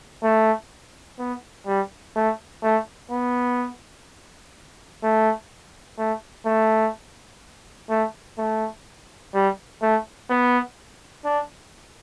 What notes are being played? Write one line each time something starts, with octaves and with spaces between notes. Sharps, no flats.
A3
B3
G3
A3
A3
B3
A3
A3
A3
A3
A3
G3
A3
B3
D4